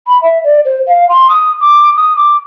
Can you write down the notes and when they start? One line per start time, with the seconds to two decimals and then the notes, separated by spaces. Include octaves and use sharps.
0.07 B5
0.22 E5
0.44 D5
0.65 C5
0.87 F5
1.09 C6
1.29 D#6
1.60 D6
1.96 D#6
2.16 D6